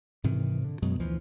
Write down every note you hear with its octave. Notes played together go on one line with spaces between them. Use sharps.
G#2 C3 D#3 E3
D3
F#2 B2 F#3 G#3
D2 E3 F3